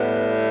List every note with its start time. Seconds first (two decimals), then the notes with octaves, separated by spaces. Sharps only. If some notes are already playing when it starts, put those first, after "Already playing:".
Already playing: A2 G3 B3 B4